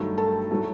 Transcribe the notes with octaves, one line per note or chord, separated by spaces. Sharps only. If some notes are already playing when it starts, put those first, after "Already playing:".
Already playing: G2 D#3 F#3 A3
A4 A5
A2 F#3 A3